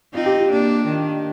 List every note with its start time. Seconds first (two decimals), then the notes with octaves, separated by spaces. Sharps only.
0.14 C4 D#4 F4
0.26 G4
0.37 F4
0.51 A#3 D4
0.86 D#3